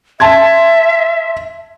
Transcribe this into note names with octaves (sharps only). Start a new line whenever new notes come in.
E5 A5 C6 G#6